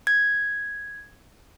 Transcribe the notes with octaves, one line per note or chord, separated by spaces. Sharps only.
G#6